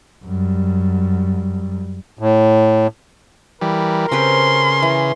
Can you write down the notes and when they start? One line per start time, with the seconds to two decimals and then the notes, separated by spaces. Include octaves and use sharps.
0.24 F#2 G3
2.19 A2
3.62 E3 G3 A#4
4.12 C#3 C4 G4 B4 C6
4.82 E3